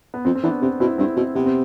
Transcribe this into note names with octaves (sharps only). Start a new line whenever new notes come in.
B3
F2 C4
C4
E3 B3 D4
C3 C4
B2 C4 E4
G2 C4 E4
B2 C4
C3 B3
C4